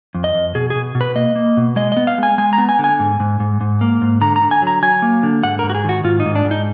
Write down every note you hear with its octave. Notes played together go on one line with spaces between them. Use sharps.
F2
D#5
F2
B2 G#4
B2 G#4
B2
B4
A#3 D#5
A#3
B2
G#3 D#5
B3 D#5
F5
G#3 G#5
G#3 G#5
A#5
B3
G#5
D3
G#5
G#2
G#2
G#2
G#2
A#3
G#2
D3 A#5
A#5
D3
G#5
F#3 A#5
F#3 G#5
A#3
D3
G#2 F#5
G#2 A#4
F#4
G#4
D#3 F#4
G#2 F4
D#4
G#2
D4
G#2
D#4